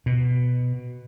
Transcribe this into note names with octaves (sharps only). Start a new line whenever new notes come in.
B2